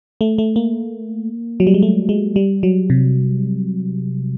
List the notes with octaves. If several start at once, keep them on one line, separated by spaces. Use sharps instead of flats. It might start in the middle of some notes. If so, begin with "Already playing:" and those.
A3
A3
A#3
F#3
G3
G#3
A3
G#3
G3
F#3
C3